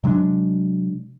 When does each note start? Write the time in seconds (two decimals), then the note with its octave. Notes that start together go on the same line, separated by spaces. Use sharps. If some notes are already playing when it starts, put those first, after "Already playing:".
0.04 C3 F#3 G#3 D4